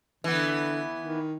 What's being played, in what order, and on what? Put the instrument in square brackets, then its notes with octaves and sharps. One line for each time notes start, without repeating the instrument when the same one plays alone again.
[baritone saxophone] D3 [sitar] E3 B3
[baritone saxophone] D#3